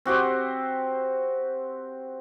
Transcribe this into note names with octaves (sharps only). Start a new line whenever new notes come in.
C4 F#4 G4 C5